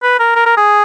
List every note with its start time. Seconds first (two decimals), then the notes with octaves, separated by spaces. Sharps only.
0.03 B4
0.19 A#4
0.35 A#4
0.46 A#4
0.57 G#4